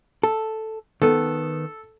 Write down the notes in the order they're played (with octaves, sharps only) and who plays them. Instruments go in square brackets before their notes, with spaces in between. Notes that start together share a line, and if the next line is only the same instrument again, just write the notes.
[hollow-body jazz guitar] A4
[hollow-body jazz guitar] D#3 B3 [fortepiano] A4